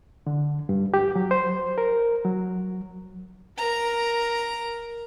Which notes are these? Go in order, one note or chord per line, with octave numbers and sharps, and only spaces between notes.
D3
G2
G4
F#3
C5
A#4
F#3
A#4 A#5